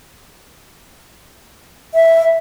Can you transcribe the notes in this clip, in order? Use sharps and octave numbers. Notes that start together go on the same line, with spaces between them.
E5